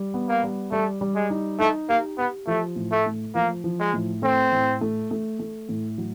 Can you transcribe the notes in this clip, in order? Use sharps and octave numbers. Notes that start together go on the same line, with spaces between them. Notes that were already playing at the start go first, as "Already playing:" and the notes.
Already playing: G3
B3
A#3
G3
G3 A3
G3
G#3
D#4
A3 D#4
A#3 G4
B3 G4
F3 A3
A2
A3
A3
F3 A#3
F3
G#3
A2
A3 C4
A2
A3
A3
A3
A2
F#3